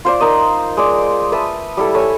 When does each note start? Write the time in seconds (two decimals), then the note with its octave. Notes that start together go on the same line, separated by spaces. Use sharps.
0.05 F4 C5 D5
0.20 D#4 A#4 D#5
0.77 G#3 D5
1.32 B4 E5 A5 D#6
1.77 G3 E4 A4
1.94 A4 C#5 G#5